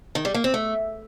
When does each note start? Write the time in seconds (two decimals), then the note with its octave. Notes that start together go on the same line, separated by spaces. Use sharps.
0.15 D#3
0.25 G3
0.34 A#3
0.44 C4
0.54 A3